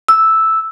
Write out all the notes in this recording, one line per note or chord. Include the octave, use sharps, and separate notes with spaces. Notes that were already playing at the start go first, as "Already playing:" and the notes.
E6